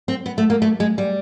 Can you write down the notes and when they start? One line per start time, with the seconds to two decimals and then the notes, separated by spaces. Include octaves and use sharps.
0.08 C4
0.26 B3
0.38 A3
0.50 A#3
0.62 A3
0.80 G#3
0.98 G3